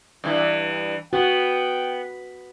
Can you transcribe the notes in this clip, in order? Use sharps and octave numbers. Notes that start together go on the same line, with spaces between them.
G2 E3
B3 F#4 G5